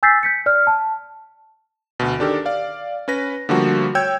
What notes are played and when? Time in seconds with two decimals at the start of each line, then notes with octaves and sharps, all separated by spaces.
0.03 G#5 E6 G6 A6 B6 C7
0.23 G6 B6 C#7
0.46 D5 F6
0.67 A5
2.00 D2 B2
2.19 D#3 D4 G4 A4 A#4
2.46 D5 F5
3.08 C#4 B4 A#6
3.49 D3 F3 G3 A3 A#3 F#4
3.95 C#5 G5 E6 G6 G#6